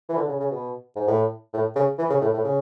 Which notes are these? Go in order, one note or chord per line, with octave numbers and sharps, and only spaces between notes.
E3
D3
C#3
C#3
B2
G#2
A2
A2
C#3
E3
C#3
A2
A2
C#3